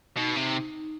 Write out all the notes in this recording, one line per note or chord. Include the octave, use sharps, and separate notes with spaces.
B2 D#4
C3